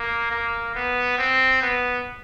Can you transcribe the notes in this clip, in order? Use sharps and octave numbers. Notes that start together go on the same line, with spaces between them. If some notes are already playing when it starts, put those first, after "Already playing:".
Already playing: A#3
A#3
B3
C4
B3